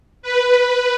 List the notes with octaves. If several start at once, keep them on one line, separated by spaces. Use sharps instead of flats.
B4